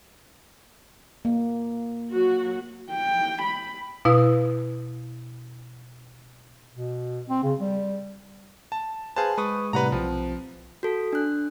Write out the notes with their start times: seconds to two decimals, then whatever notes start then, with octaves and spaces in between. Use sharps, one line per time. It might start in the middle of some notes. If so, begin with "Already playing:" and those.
1.25 A#3
2.11 F#3 F#4
2.91 G5
3.42 B5
4.05 B2 E4 B4 F5 D#6
6.73 B2
7.29 C4
7.43 C#3
7.59 G3
8.72 A5
9.16 G#4 B4 C5 F5 A5
9.38 G#3 B4 C#6 D#6
9.73 A2 C3 G3 B4 F#5 A#5
9.92 B1 F3 C4
10.83 F#4 A4
11.13 D4 F#6